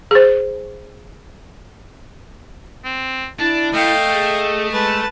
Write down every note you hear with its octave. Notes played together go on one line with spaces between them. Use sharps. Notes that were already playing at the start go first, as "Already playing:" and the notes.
G#4 C5
C4
D4 E4 A5
A3 D#5 F5 G5
G#4
G#3 B4 A5